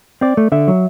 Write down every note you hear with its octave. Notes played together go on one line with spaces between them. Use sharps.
C4 D5
A3
D3 E5
F#3